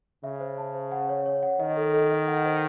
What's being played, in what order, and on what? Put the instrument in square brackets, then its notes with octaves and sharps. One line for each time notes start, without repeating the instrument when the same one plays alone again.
[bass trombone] C#3 [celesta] E5
[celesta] C5
A5
C5
F#5
C#5
C#5
F#5
[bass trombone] D#3 [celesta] D#5
[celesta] A4
A4
D#5
F#5
C5